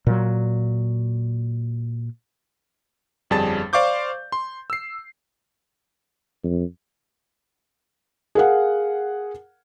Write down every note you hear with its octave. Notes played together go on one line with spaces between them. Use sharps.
A#2 F#3
G1 F2 G3 G#4 A5 A6
C5 D5 F5 C#6 D6 G6
C6
E6 C7
F2
G#4 A#4 F5 F#5